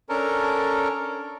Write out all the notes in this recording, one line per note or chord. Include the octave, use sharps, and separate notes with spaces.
C#4 D4 A4 A#4